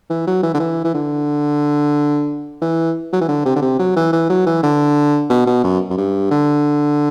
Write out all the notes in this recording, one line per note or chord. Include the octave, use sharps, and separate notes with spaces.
E3
F#3
E3
D3
E3
E3
D3
E3
F#3
E3
D3
C3
D3
C3
F#3
E3
E3
F#3
E3
D3
B2
B2
F#2
F#2
G2
D3